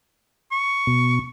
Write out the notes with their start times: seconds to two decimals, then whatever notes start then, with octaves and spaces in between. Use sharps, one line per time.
0.52 C#6
0.87 B2